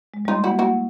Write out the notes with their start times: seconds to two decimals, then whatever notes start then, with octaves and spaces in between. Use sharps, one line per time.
0.14 G#3
0.25 G3 D#4 F4
0.36 A3
0.44 A#3 E4 F#4
0.58 A3 E4 F#4